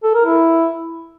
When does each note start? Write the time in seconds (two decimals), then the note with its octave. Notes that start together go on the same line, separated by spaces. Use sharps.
0.03 A4
0.14 A#4
0.25 E4